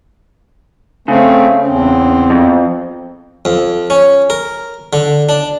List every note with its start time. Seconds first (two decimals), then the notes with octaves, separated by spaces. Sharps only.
1.08 C#3 A3 C4
1.67 E2 C4
2.30 F2
3.45 F2
3.90 C#4
4.30 A#4
4.93 D3
5.29 D4